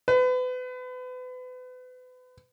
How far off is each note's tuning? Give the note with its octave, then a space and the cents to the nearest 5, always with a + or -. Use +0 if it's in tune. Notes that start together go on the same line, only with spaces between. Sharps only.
B4 +35